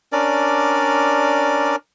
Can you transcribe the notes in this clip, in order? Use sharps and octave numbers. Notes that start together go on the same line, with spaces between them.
C#4 D4 A#4 D5